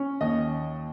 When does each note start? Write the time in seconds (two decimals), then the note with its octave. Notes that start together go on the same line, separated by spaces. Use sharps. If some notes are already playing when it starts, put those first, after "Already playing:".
Already playing: C#4
0.21 D#2 D#5